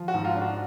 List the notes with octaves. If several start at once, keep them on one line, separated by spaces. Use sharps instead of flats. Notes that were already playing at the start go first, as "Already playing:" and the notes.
Already playing: F3
F#4
G#2
F4
D4
F#4